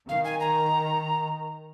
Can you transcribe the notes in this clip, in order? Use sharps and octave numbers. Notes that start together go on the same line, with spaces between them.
D#3 F5
G#5
A#5